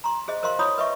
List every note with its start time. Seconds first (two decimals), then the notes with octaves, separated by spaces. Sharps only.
0.04 A#5 C6
0.28 G#4 C5 D#5
0.43 A#4 C5 D#5 F5 C6
0.59 E4 C#5 B5 D#6
0.78 B4 D#5 E5 C#6